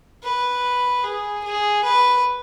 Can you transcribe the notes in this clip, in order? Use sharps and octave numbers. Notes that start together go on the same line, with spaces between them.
B4
G#4
G#4
B4